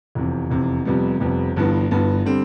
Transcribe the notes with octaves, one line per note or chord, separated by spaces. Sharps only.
F1 E2 C3
F1 E2 C3
F1 F2 C3 G3 B3
F1 F2 C3 G3 B3
G1 G2 E3 B3
G1 G2 E3 B3
D3 G3 C4